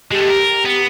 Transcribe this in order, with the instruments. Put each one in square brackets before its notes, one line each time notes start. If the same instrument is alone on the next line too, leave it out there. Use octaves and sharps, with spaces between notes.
[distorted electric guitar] G#3 A3 [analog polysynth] G4
[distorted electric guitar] A#4
B3